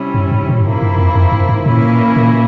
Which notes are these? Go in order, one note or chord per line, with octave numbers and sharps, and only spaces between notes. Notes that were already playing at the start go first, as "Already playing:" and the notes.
Already playing: C3 G3 C#4 E4
G2
G#2
A#2
G2
G#2 C3 F3 A#3 E4
G2
F2
F2
G2
G#2
A#2 E3 A#3 C#4 E4
A#2